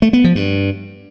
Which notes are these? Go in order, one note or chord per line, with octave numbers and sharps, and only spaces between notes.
A3
B3
F3
G2